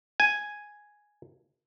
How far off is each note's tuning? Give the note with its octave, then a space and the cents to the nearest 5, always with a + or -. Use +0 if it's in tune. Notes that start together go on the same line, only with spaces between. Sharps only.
G#5 +0